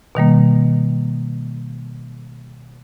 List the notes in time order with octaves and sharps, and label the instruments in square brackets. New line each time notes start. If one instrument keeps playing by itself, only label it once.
[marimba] B2 D#3 G3 A#3